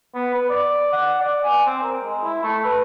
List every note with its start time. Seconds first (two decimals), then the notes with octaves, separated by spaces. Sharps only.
0.15 B3
0.34 B4
0.50 D5
0.93 F#5
1.21 D5
1.44 G#5
1.66 C4
1.83 A#4
2.04 G#3
2.24 E4
2.44 A3
2.65 B4